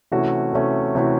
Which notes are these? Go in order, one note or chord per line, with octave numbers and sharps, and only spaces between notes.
C3 E3 A3 C#4 F#4
C3 E3 A3 C#4 F#4
C3 E3 A3 C#4 F#4